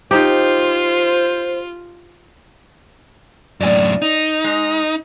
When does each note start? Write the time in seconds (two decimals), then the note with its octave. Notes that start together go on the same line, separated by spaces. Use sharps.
0.11 D#4 F4 G4 C5
3.60 F#2 A2 D5 G#5
4.02 D#4
4.44 G#3